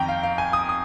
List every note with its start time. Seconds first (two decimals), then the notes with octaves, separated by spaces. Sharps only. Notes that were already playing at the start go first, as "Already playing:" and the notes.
Already playing: F2 D#3 G5 A#5
0.08 F5
0.23 F5
0.38 G#5
0.53 D#6
0.69 D#6